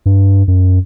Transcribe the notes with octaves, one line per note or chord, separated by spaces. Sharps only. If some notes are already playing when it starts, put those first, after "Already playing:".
G2
F#2